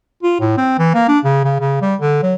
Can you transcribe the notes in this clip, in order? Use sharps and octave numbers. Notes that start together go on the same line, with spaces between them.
F4
A2
C4
E3
A#3
D4
C#3
C#3
C#3
G3
D3
F#3